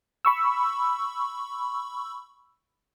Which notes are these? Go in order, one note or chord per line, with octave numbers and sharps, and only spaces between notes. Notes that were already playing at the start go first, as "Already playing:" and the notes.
B5 C#6 E6